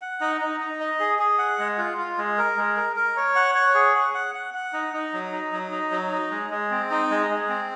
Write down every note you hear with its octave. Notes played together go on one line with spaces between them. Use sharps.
F#5
D#4
D#4
D#4
D#5
G#4
G#4
F#5
G#3
F4
F4
G#3
A#4
G#3
A#4
A#4
C#5
F#5
C#5
G#4
F#5
F#5
F#5
F#5
D#4
D#4
F#3
D#4
F#3
D#4
F#3
D#4
G#3
G#3
C4
D#4
G#3
G#3
C4